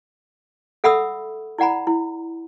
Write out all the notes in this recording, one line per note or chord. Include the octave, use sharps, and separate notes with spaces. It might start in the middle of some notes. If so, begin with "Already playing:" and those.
A4 E5 F#5 B5 D#6 E6
E4 D5 F#5 A#5 B5
E4